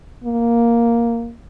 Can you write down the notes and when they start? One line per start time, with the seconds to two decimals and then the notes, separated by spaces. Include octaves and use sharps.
0.24 A#3